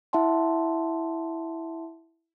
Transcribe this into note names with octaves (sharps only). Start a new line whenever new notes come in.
E4 E5 F#5 A5 C6